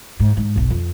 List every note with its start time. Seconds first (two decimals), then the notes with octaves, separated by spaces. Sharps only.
0.20 G#2
0.37 G#2
0.56 F#1 B1
0.70 F2